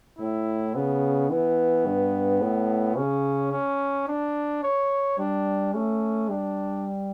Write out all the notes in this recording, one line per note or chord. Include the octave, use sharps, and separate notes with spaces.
A2 E4
C#3 B3
E3 B3
G2
A2
C#3 C#4
C#4
D4
C#5
G3 D4
A3 C#4
G3 D4